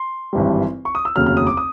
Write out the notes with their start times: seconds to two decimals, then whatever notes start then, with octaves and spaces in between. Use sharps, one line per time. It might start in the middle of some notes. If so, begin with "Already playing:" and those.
Already playing: C6
0.33 G#1 G2 E3 G3
0.85 C#6
0.95 D#6
1.05 E6
1.16 F1 D#2 C#3 F#3 F6
1.26 F6
1.37 D#6
1.47 D6
1.57 D#6